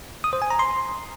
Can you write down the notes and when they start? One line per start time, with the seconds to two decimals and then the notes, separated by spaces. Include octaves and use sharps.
0.24 D#6
0.33 C5
0.42 G#5
0.51 A#5
0.59 C6